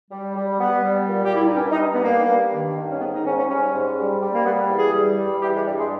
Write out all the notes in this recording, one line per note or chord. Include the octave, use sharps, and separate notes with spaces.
G3
G3
G3 B3
G3
A#2
G4
G3 E4
D#4
G2 C#4
D#4
G2
B3
G2 A#3
G2
D#3
D#3
C#4
G#2 B3
D#4
G#2 C#4
C#4
G3 C#4
G#2
G3
G3
A#3
G3 B3
E2
G#4
G3
G3
E3 G4
G#3
G2 G3
G#3